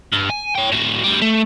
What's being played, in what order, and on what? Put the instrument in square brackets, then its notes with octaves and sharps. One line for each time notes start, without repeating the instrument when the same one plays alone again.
[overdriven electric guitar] G2
G#5
C#5 G5
A2 F#4
D2 G3
A3